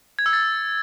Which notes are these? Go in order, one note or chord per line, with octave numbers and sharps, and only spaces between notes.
G#6
E6
A6